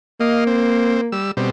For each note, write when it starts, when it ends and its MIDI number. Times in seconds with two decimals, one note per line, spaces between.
0.20 1.19 58
0.20 0.44 75
0.20 0.44 77
0.47 1.01 60
1.12 1.31 55
1.12 1.31 88
1.37 1.50 47
1.37 1.50 55
1.37 1.50 60